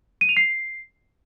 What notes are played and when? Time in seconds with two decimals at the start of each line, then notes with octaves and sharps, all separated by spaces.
0.21 D#7
0.29 F7
0.37 C7